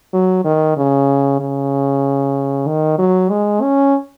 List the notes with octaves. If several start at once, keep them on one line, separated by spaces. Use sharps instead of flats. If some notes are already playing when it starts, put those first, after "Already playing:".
F#3
D#3
C#3
C#3
D#3
F#3
G#3
C#4